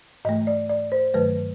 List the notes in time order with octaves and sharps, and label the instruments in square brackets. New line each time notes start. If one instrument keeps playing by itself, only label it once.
[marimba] G#2 E3 A3 D#5
D5
D5
C5
G2 D#3 F#3 A3 B4